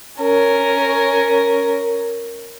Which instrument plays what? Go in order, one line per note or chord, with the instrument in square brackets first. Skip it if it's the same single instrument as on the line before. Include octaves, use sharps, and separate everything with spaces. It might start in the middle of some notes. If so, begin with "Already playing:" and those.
[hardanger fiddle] C#4 A#4